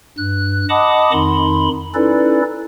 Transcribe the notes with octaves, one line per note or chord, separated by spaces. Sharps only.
G2 F#6
D#5 F#5 A5 B5 D6 D#6
F2 D#3 D#4 B5 C6
C#4 D#4 E4 A4 B4 D5